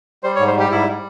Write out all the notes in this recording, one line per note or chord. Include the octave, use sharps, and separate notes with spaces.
G3 C5
C#5
G#2
C5
G3 G4
G#2 E4
G3